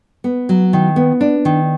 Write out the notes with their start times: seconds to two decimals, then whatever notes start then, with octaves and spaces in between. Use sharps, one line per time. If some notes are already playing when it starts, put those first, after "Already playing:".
0.24 B3
0.49 F#3
0.73 D#3
0.96 B3
1.21 D4
1.45 D#3